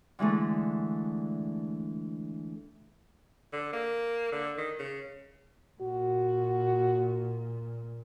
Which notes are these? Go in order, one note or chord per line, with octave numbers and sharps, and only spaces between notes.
D3 E3 G#3 A3
D3
A#3
D3
D#3
C#3
A#2 F#4